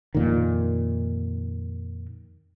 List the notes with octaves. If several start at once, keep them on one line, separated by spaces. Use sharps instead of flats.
F2 A#2 D#3